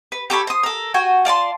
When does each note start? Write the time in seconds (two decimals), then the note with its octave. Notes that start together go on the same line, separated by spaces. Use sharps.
0.12 B4
0.30 G4 A4 C#5 B5
0.47 C5 D#6
0.63 A4 A#4
0.94 F#4 G5 G#5
1.25 F4 D5 A5 C6